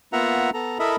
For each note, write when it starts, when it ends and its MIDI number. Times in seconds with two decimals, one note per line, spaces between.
0.13 0.50 58
0.13 0.50 59
0.13 0.50 65
0.13 0.50 76
0.13 0.50 78
0.13 0.50 82
0.54 0.78 59
0.54 0.78 69
0.54 0.78 82
0.79 0.96 64
0.79 0.96 69
0.79 0.96 70
0.79 0.96 75
0.79 0.96 76
0.79 0.96 83